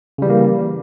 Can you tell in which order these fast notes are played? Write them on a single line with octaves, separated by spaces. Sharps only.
C#3 G3 E3 A#3